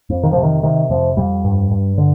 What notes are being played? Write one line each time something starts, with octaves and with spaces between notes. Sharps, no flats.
F2
D#3
C3 F3
D#3
C3 D#3
F2 F3
F2 G3
G2
G2
D3